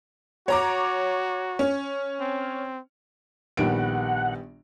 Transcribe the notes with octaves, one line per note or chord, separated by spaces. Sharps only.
F#4 C#5 A#5 D6
C#4
C4
A#1 D#3 G3 B3 F#5 D7